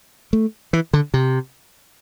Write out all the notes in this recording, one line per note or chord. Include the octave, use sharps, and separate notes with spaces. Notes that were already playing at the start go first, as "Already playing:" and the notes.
A3
E3
D3
C3